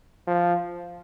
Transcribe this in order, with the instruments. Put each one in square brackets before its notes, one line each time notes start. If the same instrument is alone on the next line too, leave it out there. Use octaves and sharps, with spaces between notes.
[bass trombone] F3